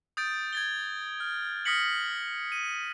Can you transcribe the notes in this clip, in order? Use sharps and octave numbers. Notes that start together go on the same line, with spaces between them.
D#6 G6 A6 D7
G#6 A6 G7
F6
D#6 F6 A#6 B6 C#7 F#7
D#7